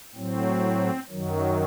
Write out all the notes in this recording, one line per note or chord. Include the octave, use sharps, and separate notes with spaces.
A2 F#3 C4
F#2 D#3 F#3